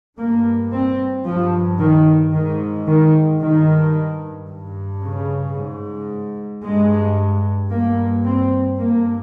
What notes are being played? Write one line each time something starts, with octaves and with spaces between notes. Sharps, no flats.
G2 A#3
C4
G2 F3
D#3
G#2 D#3
D#3
G2 D#3
G2
C#3
G#2
G2 G#3
G2 A#3
C4
G2 A#3